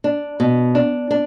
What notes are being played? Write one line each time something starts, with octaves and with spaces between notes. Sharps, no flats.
D4
B2
D4
D4